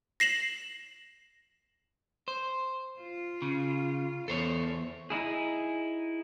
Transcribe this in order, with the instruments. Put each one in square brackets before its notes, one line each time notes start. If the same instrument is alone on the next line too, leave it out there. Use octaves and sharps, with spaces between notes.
[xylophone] A#6 C7 E7 F#7
[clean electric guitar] C5
[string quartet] F4
[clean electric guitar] C#3
[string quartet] E2 [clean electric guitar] A4 C5 C#5
[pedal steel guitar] D#4 E4 G#4